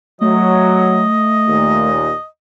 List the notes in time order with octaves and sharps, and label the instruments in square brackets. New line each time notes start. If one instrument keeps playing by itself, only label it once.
[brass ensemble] F#3 [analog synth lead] A3 [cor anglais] D#5
[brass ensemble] D#2 A#2